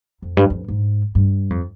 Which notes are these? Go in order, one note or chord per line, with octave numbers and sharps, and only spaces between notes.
F2
G2
F2
G#2
G2
F2